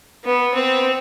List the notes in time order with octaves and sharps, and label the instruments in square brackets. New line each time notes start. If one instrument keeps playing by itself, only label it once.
[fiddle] B3
C4